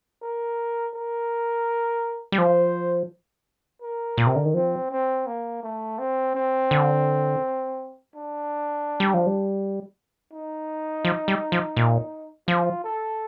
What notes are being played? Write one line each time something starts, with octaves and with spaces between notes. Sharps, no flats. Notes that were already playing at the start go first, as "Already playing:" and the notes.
A#4
A#4
G3
F3 C5
A#4
A#2
C3
D3
D#3
F3 C4
C4
A#3
A3
C4
C4
D3
D4
G3
F3
G3
D#4
F3
G3
F3
A#2
F3 F4
A4